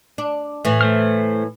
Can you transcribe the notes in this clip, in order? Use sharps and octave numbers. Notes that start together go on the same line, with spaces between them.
D4
A2 E3
A3 C5 F6